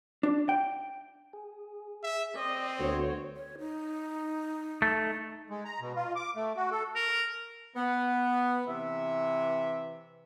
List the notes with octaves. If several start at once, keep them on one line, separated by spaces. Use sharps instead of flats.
D4
G5
G#4
E5
C4 D5 D#5
D2 A3 B3 F#4 C5 C#5
C#5
D#4
A3
G#3
A#5
B2
F4
D6
A3
F#4
A4
A#4
B3
C3 E3 E5